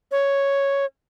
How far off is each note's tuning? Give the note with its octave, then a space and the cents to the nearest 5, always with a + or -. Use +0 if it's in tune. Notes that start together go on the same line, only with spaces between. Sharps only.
C#5 +0